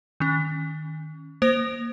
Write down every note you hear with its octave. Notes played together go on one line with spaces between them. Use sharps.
D#3 C#4
A#3 C5 A#6 D7 F7